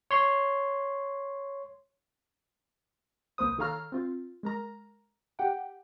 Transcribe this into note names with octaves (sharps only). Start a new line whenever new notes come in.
C#5 C6
C2 A#3 B4 C5 D#6
D#3 A4 C#5 F5 A#5 F6
C4 F4
G#3 A#4 A#5
G4 F#5 G5